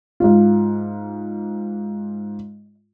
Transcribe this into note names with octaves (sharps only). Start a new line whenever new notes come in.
G#2 F4